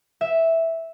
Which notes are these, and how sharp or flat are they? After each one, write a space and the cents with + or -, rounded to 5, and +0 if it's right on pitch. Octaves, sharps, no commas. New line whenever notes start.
E5 -5